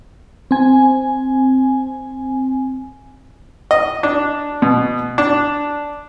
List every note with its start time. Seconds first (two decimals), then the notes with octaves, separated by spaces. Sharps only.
0.51 C4 G#5
3.71 D#5
4.03 D4
4.62 B2
5.18 D4